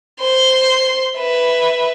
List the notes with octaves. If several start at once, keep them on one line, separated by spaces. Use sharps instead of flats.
C5 C6
B4 E5